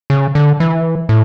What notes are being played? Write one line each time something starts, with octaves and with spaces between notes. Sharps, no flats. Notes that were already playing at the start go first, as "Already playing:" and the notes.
C#3
D3
E3
A2